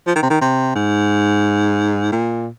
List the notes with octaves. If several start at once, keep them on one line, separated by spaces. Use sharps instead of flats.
F3
D#3
C3
D#3
C3
G#2
A#2